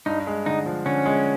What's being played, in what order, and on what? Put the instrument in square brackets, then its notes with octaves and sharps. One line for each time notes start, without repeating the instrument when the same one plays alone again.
[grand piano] G2 [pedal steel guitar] D#4
[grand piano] G#3
[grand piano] D3 [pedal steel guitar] D#4
[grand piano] F3
[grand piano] D3 [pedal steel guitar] C#4
[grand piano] G#3